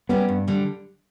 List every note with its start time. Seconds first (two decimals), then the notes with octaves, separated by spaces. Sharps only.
0.09 G3 B3 C#4 G4
0.29 G2
0.48 D3 G3